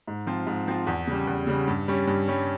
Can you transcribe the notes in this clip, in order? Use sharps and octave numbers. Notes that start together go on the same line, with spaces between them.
G#2
F3 C4 F4
G#2
F3 C4 F4
E2
C#3 G3
E2
C#3 G3
G2
G3 C#4
G2
G3 C#4